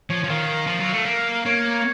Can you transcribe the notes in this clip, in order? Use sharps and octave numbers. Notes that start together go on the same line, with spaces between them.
F3 C#5
F3
D#3 F5
F3
F#3
A3
A#3
A#3 C#5